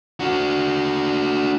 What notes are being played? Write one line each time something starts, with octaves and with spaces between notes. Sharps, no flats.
D4 F#4